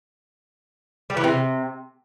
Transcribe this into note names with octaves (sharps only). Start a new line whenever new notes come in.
G3
E3
C3